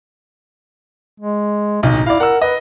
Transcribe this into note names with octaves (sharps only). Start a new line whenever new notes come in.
G#3
D1 B1 D#4 D#5
E4 D5 F5
A#4 F#5 E6
B4 D#5